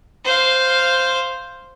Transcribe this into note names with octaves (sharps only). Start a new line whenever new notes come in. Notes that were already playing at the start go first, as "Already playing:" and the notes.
C5 F5